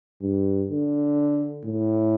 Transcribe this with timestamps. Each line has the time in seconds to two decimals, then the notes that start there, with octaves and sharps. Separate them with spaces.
0.22 G2
0.70 D3
1.64 A2